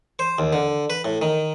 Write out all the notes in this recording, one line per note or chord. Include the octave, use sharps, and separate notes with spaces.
C5
D#2
D3
B4
A2
D#3